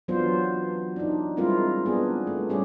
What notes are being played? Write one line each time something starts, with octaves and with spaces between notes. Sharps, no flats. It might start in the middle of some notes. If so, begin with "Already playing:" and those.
E3 F#3 B3 D4 F4 C5
D4 D#4
G3 G#3 C4 E4 F4 A#4
B3 D4 G#4
A3
G3 C#4 G4 G#4